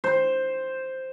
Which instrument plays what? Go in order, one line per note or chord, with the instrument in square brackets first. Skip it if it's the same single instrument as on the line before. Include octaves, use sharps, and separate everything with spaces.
[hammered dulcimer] C5